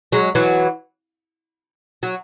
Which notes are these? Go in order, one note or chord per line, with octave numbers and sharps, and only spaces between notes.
F#3 G#3
E3 F#3
F#3